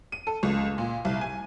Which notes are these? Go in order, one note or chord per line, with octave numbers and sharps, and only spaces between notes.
D#7
A4
C#2
A#2
C2
G#5